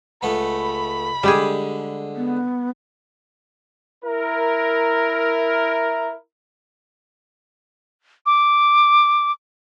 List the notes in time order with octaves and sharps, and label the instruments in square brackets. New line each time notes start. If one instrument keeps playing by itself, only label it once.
[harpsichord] C#2 A3 B3 [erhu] B5
[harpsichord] D3 G#3 [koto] G3 G4 G#4
[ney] B3
[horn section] E4 A#4
[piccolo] D6